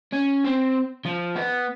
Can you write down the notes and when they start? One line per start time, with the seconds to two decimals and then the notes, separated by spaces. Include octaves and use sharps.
0.13 C#4
0.44 C4
1.06 F3
1.35 B3